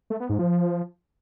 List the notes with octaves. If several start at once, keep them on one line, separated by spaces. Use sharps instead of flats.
A3
B3
G#2
F3